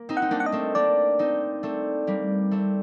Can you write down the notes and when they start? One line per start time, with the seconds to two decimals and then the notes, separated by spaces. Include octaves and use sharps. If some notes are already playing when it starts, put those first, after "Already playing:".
Already playing: A#3
0.09 C4 D#4
0.17 F#5
0.22 D#4
0.31 A#3 D4
0.40 F#5
0.46 D#5
0.52 A3 C4
0.75 A#3 D4 D5
1.19 C4 D#4
1.63 A3 C4
2.07 G3 A#3
2.51 A3 C4